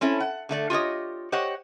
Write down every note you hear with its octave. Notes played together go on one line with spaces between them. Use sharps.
C4 C#4 E4 A4
F#5
D3 A3 D5
F4 G4 C#5 D#5
G4 C5 C#5 D#5 F#5